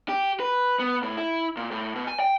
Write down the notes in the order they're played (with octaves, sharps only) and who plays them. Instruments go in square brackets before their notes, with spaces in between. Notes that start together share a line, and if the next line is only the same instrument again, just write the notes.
[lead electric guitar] G4
B4
B3
A2
E4
A#2
A2
B2
G#5
G5